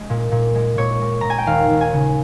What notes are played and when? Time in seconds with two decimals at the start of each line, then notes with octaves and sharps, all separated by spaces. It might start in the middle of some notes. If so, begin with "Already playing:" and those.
Already playing: G#3
0.10 A#2
0.32 A#2
0.55 G#3
0.78 A#2 C#5
1.01 G#3
1.21 A#2 A#5
1.30 G#5
1.38 G5
1.47 D#2 F5
1.70 D#2
1.81 G#5
1.93 C#3